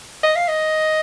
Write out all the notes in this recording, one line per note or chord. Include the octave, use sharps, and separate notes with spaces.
D#5
F5
D#5